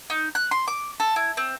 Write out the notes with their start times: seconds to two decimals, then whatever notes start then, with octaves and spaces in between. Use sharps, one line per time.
0.10 D#4
0.35 F#6
0.51 C6
0.68 D6
1.00 A4
1.16 E4
1.37 C4